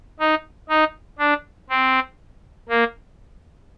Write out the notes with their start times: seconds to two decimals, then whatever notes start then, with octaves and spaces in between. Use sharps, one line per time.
0.20 D#4
0.69 D#4
1.19 D4
1.70 C4
2.69 A#3